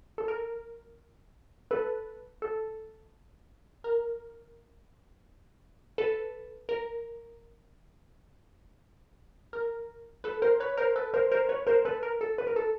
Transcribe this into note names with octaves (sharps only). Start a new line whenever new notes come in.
A4
A#4
A4 B4
A4
A#4
A4 B4
A#4
A#4
A4 B4
A#4 C5
B4 C#5
A#4 C5
A4 B4
A#4 C5
A#4 C5
B4 C#5
A#4 C5
A4 B4
A#4
A4
B4
A#4
A4